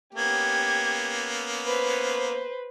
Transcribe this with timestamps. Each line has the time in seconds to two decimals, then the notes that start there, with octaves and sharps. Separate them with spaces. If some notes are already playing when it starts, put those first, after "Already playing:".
0.14 A#3 B3 C#4 G4 G#6
1.67 B4 C5